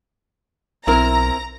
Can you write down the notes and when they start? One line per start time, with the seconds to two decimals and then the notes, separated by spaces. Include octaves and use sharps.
0.87 B1 C4 E4 A#4 A#5